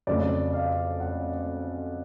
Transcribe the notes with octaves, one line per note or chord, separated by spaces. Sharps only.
F2 C#3 F#3 A3 D5
F5
F#5